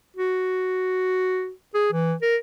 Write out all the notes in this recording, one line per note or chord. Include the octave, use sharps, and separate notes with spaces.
F#4
G#4
E3
A#4